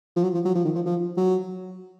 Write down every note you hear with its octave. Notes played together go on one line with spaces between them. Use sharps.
F3
F#3
F3
F#3
F3
D#3
F3
F3
F#3